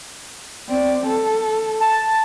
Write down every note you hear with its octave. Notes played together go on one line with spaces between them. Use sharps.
C4 D5
A4
A5